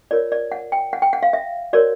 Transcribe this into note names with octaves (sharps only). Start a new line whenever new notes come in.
F4 A#4 C#5 D5
D5
F#5
G5
F#5
G5
F#5
F5
E5
F#4 A#4 C#5 D5